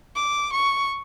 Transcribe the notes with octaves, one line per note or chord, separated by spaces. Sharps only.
D6
C#6